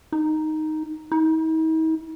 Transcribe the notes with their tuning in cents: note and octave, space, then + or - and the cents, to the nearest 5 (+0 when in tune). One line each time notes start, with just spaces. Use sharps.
D#4 +0
D#4 +45